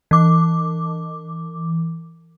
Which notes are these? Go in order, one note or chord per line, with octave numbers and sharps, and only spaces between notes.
E3 D6